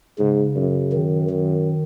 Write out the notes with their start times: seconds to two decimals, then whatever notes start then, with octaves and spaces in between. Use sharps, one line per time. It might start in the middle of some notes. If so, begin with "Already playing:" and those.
0.19 G#2 C#3
0.56 F#2
0.93 D#3
1.30 D#3